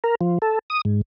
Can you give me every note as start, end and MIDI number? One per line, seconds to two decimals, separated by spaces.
0.04 0.15 70
0.21 0.38 53
0.42 0.59 69
0.70 0.81 87
0.85 1.01 44